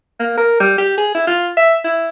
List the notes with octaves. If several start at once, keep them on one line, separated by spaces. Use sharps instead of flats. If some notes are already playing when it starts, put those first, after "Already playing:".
A#3
A#4
G3
G4
G#4
E4
F4
E5
E4